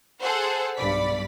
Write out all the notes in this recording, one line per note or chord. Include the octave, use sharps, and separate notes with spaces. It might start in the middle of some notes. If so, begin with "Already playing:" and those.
G#4 A4 C5 F#5
B1 G2 D5 B5 B6